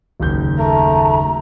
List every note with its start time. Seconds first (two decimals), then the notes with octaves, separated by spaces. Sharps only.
0.20 F#1 D#2 G6
0.58 A3 A#5